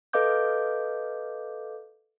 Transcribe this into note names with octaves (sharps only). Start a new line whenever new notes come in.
A4 B4 D#5 F5 D6 G6